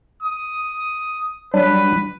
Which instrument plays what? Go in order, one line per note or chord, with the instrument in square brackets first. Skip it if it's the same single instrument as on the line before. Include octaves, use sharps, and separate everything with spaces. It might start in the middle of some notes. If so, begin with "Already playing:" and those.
[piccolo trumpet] D#6
[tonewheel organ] F#3 G3 D4 [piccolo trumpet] B4